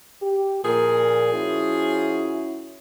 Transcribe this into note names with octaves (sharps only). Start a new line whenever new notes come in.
G4
A#2 F3 G#4 A#4
C#4 E4 F#4